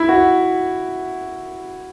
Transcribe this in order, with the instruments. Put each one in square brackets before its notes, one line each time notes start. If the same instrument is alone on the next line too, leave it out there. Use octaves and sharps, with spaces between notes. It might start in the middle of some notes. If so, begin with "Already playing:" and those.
Already playing: [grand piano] E4
F#4